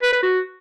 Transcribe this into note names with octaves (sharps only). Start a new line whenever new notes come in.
B4
B4
F#4